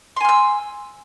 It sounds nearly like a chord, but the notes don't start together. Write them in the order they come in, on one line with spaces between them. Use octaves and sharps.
C6 G#5 F6 E6